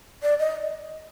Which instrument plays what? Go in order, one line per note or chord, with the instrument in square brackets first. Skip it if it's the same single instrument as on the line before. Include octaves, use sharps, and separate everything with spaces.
[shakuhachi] D5
D#5